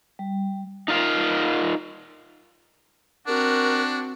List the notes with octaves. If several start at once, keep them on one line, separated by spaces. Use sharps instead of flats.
G3
D#4 F4 A#4 F5
C4 D4 F#4 A#4